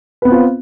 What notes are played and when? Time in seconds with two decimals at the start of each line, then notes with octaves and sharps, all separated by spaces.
0.22 B4
0.25 B3
0.28 C4
0.32 F4